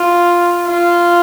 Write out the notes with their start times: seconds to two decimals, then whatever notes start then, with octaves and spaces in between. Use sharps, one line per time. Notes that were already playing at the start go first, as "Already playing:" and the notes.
Already playing: F4
0.68 F4